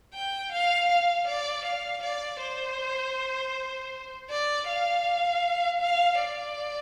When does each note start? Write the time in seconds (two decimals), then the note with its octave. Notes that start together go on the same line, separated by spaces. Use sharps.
0.14 G5
0.52 F5
0.89 F5
1.27 D5
1.65 F5
2.03 D5
2.41 C5
4.30 D5
4.68 F5
5.81 F5
6.19 D5